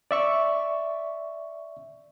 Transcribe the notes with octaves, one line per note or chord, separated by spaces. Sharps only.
D5 E5 C#6